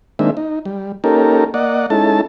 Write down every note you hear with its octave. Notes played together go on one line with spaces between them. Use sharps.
D#3 G#3 A#3 C4 D4 E5
D#4
G3
A#3 C#4 D#4 G4 A4 A#4
A#3 D5 D#5 F#5
G#3 C#4 D#4 E4 A4 A5